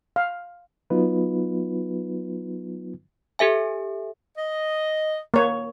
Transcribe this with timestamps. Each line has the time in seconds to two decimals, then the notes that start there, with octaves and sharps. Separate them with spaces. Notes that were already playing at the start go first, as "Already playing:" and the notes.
0.16 F5
0.90 F#3 B3 D#4 F4 B4
3.39 G4 A4 E5 G#5
4.37 D#5
5.34 A#3 C#5